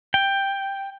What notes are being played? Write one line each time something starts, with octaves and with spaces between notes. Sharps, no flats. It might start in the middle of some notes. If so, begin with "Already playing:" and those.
G5